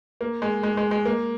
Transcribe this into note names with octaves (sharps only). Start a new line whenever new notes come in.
A#3
G#3
G#3
G#3
G#3
A#3